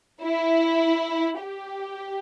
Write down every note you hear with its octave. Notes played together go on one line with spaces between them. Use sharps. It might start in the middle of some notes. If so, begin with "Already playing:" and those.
E4
G4